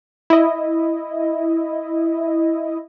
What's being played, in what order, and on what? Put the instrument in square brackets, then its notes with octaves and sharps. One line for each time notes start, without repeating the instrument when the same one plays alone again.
[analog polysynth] E4 D#5